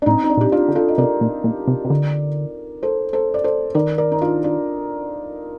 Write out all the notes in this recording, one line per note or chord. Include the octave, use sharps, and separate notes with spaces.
D4
A2 C4 D#4
D#4
D4
A#2 G4
D4 F4
D3
F4 A4
D#5
C3 A#4 D5
A#2
A#2
C3
C3
D3
A4 C5
A4 C5
D5
A4 C5
D#3 A#4 D5
A#4 D5
D#4
D4 F4
D4 F4